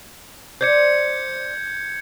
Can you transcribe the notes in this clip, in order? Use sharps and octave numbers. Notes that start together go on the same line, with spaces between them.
C5 D5 G6 G#6 C#7